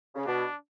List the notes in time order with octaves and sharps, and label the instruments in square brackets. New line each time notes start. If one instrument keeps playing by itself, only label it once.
[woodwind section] C#3
[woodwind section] B2 [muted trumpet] D4